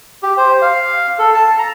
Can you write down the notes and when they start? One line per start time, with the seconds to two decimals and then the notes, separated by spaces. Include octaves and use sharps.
0.23 G4
0.37 C5
0.62 F5
1.19 A4
1.34 A5
1.59 A#5